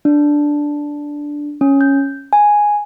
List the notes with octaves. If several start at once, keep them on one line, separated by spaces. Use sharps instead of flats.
D4
C#4
G6
G#5